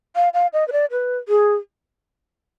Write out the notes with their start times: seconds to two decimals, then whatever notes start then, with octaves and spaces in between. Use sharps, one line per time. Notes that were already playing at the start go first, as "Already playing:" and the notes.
0.16 F5
0.34 F5
0.53 D#5
0.68 B4
0.72 D5
0.91 B4
1.29 G#4